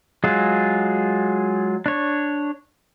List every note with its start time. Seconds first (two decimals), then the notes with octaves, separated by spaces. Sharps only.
0.24 F#3 G#3 F4 G#4
1.86 D4 C#5